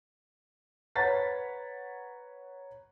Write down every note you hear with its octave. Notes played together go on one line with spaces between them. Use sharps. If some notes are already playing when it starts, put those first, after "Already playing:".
B4 C#5 F#5 A#5 A6 B6